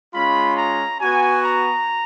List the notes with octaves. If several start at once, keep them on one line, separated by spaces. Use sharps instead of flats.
G#3 C#4 F4 B5
A#5
B3 F#4 G#5
A#5